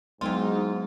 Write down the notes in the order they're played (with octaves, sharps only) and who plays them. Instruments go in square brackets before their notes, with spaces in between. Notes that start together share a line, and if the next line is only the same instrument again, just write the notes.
[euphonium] G#2 [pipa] E3 C4 F4 [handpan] F#3 G#3 B3 [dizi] D#4